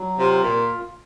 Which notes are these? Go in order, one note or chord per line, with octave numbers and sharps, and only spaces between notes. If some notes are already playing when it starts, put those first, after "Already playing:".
Already playing: F#3
C3 F4
A#2